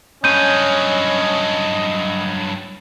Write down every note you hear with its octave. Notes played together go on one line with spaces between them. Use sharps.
G2 F#3 C#4 D#5 G6 D#7